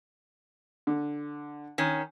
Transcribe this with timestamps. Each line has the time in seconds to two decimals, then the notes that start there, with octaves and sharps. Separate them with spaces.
0.87 D3
1.78 D#3 C#4